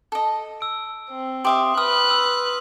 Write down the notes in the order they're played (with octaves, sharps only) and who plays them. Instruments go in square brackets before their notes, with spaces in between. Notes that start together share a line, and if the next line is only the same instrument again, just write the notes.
[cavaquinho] A4 D#5
[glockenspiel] E6 D7
[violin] C4
[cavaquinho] G4 E5 F5 [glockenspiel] C6 D#6
[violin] B4 F#6 [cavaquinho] D#6 [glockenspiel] F6 F#7
[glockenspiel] E6